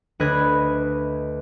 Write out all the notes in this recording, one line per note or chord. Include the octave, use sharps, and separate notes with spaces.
D2 B4 D#5 F#6 G#6